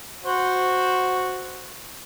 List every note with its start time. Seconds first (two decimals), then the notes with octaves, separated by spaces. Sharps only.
0.24 F#4 C5